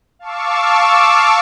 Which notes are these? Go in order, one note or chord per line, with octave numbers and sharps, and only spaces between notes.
F5 A5 C#6 D6 E6